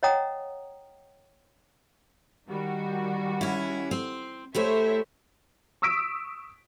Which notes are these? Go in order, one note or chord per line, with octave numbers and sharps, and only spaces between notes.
C#5 D#5 F#5 G5 A#5 D#6
D#3 G3 F#4
C#4 E4
C4 C5
A3 E4 G4 C5 C#5 E5
C#6 D#6 E6 B6 D7